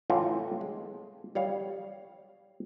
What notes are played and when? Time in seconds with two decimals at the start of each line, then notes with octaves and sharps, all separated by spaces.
0.10 A2 E3 F4
0.61 G#3
1.35 G3 C#5 F5